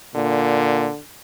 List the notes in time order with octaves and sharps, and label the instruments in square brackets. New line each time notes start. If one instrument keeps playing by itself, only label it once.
[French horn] A#2 [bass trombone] D3